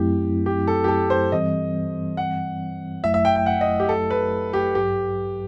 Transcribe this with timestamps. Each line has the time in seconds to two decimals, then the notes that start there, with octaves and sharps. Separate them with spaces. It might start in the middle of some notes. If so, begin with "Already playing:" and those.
Already playing: F#2 F#3 A3 C4 E4 G4
0.46 G4
0.67 A4
0.84 G4
0.88 A4
1.10 C5
1.32 G2 E3 G3 C4 D#5
2.17 F#5
3.04 G1 F#2 F#3 A3 E4 E5
3.14 E5
3.25 G5
3.36 G5
3.46 F#5
3.61 D#5
3.80 G4
3.89 A4
4.10 B4
4.53 G4
4.74 A1 G2 F#3 G4